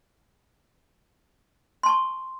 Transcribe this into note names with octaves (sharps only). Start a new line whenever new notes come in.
A5 C6 C#6